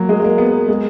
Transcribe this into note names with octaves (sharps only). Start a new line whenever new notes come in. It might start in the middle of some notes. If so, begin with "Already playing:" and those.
Already playing: F#3 A#3
G#3
G#3
A#3
B3
A#3
G#3